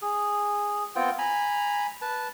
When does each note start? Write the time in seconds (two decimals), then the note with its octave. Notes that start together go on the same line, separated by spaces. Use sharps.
0.02 G#4
0.96 B3 C4 F4 G5
1.18 G#5 A#5 B5
2.02 B4 A5